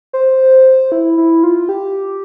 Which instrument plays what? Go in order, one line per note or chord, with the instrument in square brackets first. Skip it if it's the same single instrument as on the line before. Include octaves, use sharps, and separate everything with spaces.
[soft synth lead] C5
E4
E4
F4
G4